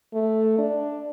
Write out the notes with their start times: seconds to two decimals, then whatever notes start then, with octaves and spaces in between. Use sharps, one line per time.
0.14 A3
0.59 D4